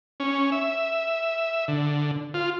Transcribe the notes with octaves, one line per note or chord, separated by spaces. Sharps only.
C#4
E5
D3
F4